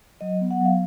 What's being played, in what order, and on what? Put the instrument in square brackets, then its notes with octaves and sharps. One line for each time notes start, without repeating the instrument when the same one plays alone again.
[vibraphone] F#3 D#5
B3
F#5
F#3 F5